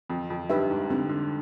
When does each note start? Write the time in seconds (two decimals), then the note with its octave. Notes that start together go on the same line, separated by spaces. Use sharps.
0.10 F2 C4
0.30 F2
0.50 G2 D#4 G4 B4 E5
0.70 G#2
0.90 D3 C4
1.09 D3